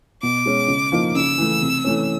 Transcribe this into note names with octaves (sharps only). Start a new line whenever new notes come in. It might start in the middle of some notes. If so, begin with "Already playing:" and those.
B2 D6
G#3 C#4
C#3
F3 A#3 D#4
C#3 E6
E3 A3
C3
E3 A3 C#4